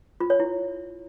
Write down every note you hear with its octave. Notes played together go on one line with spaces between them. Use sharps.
F4
C#5
E4